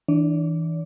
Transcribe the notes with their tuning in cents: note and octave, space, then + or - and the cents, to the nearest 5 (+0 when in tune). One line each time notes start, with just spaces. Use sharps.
E3 -25 D4 +0 D5 -45